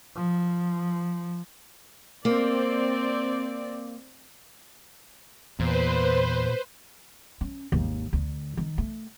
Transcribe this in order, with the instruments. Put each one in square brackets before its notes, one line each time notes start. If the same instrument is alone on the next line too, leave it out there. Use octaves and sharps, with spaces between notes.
[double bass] F3
[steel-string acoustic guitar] A#3 [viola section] C4 D5
[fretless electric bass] E2 [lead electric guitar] A#2 [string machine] B4 C5
[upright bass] C#4
G#1 D#2
D2
D#3
A3